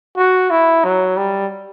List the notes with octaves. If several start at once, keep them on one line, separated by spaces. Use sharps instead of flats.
F#4
E4
F#3
G3